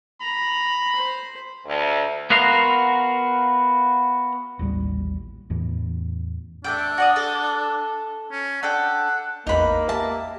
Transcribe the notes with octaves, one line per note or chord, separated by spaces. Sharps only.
A#5 B5
C5
D2
B3 F#4 A#4 F5 C6
A1 D#2 A2 G3
E2 A2 E3
A3 D4 A4 G5
F#4 D5 D#6
A4
C#4
D4 A4 F#5 G5
A1 E2 A#3 D#4 B5
G4 E5 A5